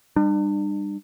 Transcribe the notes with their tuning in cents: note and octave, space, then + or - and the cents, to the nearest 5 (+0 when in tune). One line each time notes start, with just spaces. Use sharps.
G3 +20 D4 +40